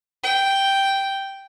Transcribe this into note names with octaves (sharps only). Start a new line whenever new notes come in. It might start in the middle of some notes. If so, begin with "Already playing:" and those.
G5